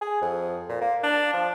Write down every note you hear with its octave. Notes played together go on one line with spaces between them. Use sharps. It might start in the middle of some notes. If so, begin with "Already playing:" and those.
G#4
F2
A#2
A#3
D4
F3